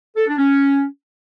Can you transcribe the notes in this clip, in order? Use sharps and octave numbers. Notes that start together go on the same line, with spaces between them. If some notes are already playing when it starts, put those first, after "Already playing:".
A4
D4
C#4